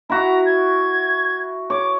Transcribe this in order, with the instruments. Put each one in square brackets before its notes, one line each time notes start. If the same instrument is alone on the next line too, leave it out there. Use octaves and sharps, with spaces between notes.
[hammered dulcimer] E4 F#4 [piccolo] A#5
[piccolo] G#6
[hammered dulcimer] C#5 [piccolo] D6